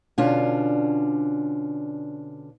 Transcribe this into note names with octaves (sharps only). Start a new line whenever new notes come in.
B2 D3 C#4 D4 F4